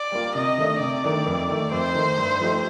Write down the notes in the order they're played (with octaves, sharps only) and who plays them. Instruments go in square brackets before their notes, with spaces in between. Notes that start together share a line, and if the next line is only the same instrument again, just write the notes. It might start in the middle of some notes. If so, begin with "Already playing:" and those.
Already playing: [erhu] D5
[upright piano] G3 A#3 F4
[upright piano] C3 [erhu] D#5
[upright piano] D#3 A3 D4
[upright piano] C3 [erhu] D5
[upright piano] D#3 A3 D4
F2
D#3 A3
[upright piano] F2 [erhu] C5
[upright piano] D#3 A3
G2
F3 A3 D#4 G4